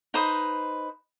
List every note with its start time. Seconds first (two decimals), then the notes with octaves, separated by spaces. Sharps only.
0.14 D#4 B4 C5 D#6